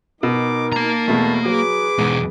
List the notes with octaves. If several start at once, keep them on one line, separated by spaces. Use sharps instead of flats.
B2 D#4 A#4 D6
A#3 A5 A#5
E2 B2 A3
F#3 G#4 B4 D6
E2 G#2 B2